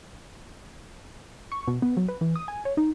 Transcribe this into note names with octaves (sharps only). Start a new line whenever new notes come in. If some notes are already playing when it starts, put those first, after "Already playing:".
C#6
B2
B3
F#3
B4
E3
D#6
G#5
C#5
D#4